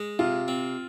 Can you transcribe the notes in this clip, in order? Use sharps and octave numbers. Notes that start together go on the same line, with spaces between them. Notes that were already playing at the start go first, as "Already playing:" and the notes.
Already playing: G#3
C3 F4
C4